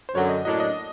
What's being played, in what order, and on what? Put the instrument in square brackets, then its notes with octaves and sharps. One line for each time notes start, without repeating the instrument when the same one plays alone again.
[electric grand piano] C5
[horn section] F#2 D3 F#3 [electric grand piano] C#5
[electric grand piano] D#5
[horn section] A2 F#3 A#3 D4 [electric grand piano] D#5
[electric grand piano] D#5